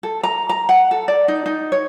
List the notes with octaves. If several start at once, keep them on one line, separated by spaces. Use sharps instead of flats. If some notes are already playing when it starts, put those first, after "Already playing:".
A4
A#5
A#5
F#5
A4
D5
D#4
D#4
C#5